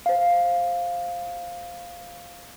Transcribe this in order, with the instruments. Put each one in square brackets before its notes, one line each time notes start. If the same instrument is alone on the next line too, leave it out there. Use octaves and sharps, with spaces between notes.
[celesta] C5 F5